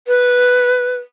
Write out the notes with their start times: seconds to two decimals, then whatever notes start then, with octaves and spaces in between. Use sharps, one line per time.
0.07 B4